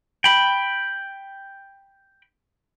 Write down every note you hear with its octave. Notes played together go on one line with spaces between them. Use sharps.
G5 B5